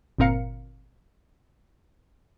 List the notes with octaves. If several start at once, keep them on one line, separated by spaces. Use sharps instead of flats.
G1 A#2 C4 A#4 F5 C#7